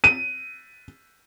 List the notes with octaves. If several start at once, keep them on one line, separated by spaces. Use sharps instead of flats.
D#7